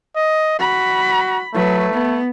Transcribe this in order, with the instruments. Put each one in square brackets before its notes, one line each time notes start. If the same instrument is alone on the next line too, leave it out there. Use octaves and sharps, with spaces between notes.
[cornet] D#5
[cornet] F#4 [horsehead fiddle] B5
[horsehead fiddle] F#3 B4 [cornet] A3
[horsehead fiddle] B3